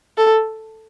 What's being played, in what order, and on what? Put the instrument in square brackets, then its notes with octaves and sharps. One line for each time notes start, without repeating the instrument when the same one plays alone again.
[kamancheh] A4